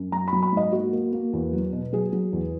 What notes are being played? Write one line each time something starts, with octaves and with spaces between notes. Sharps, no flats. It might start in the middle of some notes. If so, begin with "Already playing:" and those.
Already playing: F#2
F#3 A#5
B5
F#3
B5
G#2 D#5
A#3 F#4
A#3
A#3
E2
F#3
B2
F#3 G#4
F#3
E2